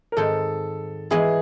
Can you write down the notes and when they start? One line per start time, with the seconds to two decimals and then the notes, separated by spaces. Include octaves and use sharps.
0.12 A#4
0.17 G#2 D#3 G#3 C4 A4
1.11 E3 G#3 B3 E4 G#4